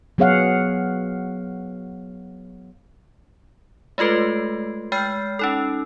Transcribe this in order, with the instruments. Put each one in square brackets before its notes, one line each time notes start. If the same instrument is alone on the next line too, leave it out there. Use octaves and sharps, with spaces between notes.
[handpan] F#3 B3 G#4 C#5 F5 F#5
[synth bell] G#3 A3 F4 A4 B4
G#3 G5 F6 G6 C7
C#4 D#4 A4